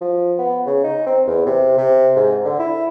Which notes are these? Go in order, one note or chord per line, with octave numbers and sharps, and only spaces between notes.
F3
B3
C#3
D#4
C4
E2
C3
C3
G#2
D3
E4